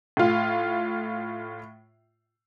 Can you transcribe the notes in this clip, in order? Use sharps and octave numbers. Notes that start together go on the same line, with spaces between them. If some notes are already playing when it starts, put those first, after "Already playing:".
A2 F4